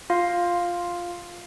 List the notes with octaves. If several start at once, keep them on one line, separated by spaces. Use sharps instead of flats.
F4 F5